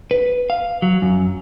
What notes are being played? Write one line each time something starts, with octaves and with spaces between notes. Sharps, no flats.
B4
F5
F#3
F#2